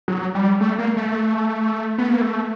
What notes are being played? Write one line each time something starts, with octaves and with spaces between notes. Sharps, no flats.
F#3
G3
A3
A#3
A3
B3
A#3
A3